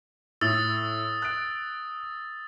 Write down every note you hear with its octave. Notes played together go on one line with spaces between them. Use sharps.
A2 D#6 E6 A6
F#6 D7